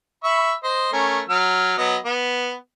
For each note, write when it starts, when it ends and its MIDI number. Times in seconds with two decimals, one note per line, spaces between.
0.24 0.52 76
0.24 0.52 83
0.24 0.52 85
0.63 0.91 72
0.63 0.91 75
0.93 1.21 57
0.93 1.21 61
0.93 1.21 70
1.29 1.77 54
1.29 1.77 89
1.78 1.96 54
1.78 1.96 59
1.78 1.96 75
2.05 2.53 59